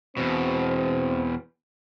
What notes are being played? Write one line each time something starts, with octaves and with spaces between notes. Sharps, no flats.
E2 B2 C4